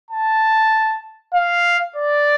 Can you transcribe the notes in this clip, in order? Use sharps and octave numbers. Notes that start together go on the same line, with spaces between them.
A5
F5
D5